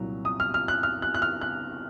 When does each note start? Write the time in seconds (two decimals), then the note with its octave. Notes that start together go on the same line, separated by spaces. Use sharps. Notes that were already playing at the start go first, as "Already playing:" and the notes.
Already playing: C2 A#2 F#3
0.25 D#6
0.40 F6
0.54 F6
0.68 F#6
0.83 F6
1.02 F#6
1.14 F#6
1.22 F6
1.41 F#6